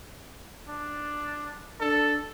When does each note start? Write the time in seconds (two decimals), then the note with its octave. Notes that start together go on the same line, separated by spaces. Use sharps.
0.68 D4
1.81 D4 A4